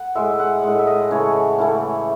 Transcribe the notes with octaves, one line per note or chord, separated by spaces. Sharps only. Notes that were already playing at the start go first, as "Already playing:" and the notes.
Already playing: F#5
A2 G#3 E5
F#5
A2 G#3
E5
D#5
C#3 E3 A3 C#5
C#3 E3 A3